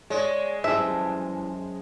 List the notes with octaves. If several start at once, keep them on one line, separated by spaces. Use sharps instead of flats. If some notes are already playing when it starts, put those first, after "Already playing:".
G#3 C#5 D5
F#2 E3 G3 G#4 C5 E5 A5